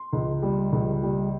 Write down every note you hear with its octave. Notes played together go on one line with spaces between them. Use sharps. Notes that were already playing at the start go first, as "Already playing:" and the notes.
Already playing: C6
C#2
G3
C#2
G3